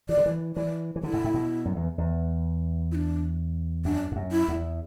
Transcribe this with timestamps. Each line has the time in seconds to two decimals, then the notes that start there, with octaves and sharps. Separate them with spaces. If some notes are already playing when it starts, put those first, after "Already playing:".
0.09 E3 D5
0.17 D3
0.26 E3
0.56 E3 D5
0.96 E3
1.03 D3 E4
1.13 G#2
1.24 A2
1.34 B2
1.65 F#2
1.76 E2
1.98 E2
2.91 E4
2.95 D4
3.85 F#2 D4
4.12 G#2
4.16 F#2
4.31 E4
4.48 E2